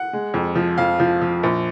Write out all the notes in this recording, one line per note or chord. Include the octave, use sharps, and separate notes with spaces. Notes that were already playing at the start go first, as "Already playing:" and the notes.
Already playing: F#5
G#3
F2
F3
F2 F5
F3
F3
A#1